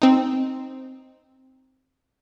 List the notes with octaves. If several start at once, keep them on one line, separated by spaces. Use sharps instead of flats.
C4 D#4